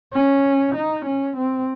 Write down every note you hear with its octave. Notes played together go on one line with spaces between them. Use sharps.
C#4
D#4
C#4
C4